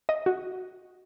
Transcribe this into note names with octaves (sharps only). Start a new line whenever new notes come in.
D#5
F#4